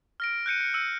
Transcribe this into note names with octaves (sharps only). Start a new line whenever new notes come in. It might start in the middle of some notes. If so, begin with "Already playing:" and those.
F6 A#6 D7
F#6 G6 C#7 D#7
C#7
E6 C#7 D#7